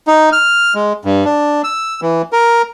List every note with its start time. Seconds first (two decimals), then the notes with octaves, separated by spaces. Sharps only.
0.07 D#4
0.32 F6
0.75 G#3
1.05 G2
1.25 D4
1.64 E6
2.02 E3
2.32 A#4